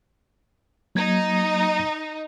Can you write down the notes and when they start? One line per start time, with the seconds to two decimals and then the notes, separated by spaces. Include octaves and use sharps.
0.95 F#3 A#3 D#4 G#6